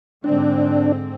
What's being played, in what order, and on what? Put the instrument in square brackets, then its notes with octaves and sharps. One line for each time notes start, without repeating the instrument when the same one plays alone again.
[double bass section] G#2 D3 C4 [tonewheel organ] D4